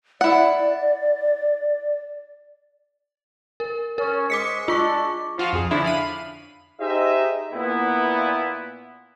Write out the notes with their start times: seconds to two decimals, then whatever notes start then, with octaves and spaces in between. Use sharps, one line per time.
0.21 E4 D5 F#5
3.60 A#4
3.98 C#4 A#4
4.30 G#2 G#3 D6 B6 C#7
4.68 G#3 D4 F4 C#6
5.38 F3 F4 F#4
5.53 F2 G#4
5.71 D3 F3 C#4 D4 E4
5.85 F5 B5 D#7
6.80 D#4 G4 G#4 C5 D#5 E5
7.53 A#2 B3 E4